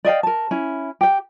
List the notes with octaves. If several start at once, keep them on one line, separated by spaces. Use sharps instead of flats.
D5 D#5 F5 G5
A#4 A5
C#4 E4
G4 G5